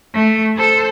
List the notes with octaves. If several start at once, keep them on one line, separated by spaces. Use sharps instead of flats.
A3
A4 C5